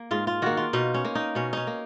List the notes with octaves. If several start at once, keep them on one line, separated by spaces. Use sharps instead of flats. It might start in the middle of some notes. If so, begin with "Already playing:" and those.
Already playing: A#3
G#2 F4
F4
D#3 A#3 F#4
F4
B2 D#4
C#4
A#3
D#4
B2 C#4
C#4 D#4
A#3